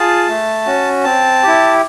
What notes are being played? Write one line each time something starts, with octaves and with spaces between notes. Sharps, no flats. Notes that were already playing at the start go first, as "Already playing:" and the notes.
Already playing: F4 G#4 A5
A3
C#4 F#4
C4 A5
E4 G4